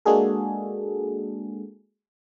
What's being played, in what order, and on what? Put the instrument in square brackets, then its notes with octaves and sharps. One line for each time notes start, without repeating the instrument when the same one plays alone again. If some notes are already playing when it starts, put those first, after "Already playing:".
[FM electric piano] G#3 A#3 D4 F#4 G#4 A4